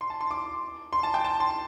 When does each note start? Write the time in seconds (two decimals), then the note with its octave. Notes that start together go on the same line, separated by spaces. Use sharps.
0.01 C6
0.10 A5
0.21 C6
0.31 D6
0.93 C6
1.03 A5
1.14 G5
1.24 A5
1.40 C6